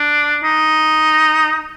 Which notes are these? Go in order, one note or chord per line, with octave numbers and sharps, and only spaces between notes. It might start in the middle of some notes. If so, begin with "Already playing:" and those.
Already playing: D4
D#4